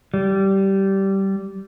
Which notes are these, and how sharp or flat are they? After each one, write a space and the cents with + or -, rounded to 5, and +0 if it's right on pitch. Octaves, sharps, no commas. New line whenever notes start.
G3 -15